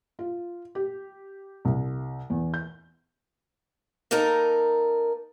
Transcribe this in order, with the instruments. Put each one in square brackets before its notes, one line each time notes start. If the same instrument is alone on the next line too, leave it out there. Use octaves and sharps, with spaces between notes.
[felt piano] F4
G4
C2
E2
G6
[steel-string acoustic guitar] A#3 D#4 A4 A#4